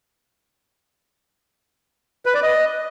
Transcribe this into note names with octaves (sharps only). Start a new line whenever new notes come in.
B4
D5
D#5